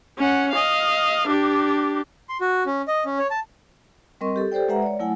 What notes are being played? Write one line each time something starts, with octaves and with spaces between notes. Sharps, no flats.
C#4 F#5
D#5 F5
D4 G4
C6
F#4
C#4
D#5
C#4
C#5
A5
G3 C4 A#4 D#5 C6 C#6
G4 A4
G4 A4 C5 D5 G5
G#3 B4 E5 F#5 A#5
C#5 D5
F#3 A3 E4 F#5 G#5